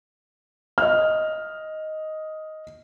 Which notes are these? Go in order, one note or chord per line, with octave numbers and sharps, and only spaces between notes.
D#5 F6